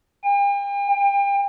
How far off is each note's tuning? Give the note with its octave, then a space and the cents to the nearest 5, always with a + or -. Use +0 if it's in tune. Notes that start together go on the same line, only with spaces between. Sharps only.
G5 +45
G5 +35